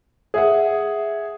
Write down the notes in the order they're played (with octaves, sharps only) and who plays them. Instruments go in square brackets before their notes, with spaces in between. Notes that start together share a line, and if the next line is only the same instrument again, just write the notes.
[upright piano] G#4 E5 F#5